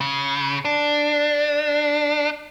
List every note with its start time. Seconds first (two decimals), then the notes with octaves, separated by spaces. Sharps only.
0.01 C#3
0.65 D4